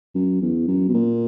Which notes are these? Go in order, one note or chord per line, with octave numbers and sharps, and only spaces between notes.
F#2
E2
F#2
B2
A#2